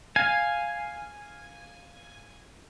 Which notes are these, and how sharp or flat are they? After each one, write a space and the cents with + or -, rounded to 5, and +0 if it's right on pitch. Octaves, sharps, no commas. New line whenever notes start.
F5 +0 G#5 +0